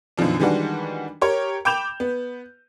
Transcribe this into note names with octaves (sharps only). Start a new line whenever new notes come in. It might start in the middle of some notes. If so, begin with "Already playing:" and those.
F#2 B2 D#3 F3 D4
D#3 E3 G3 G#3 D4 F#4
G4 A#4 C#5
G5 B5 D6 G6 E7 F7
B3